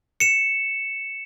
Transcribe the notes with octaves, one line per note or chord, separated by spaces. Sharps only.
C#7 E7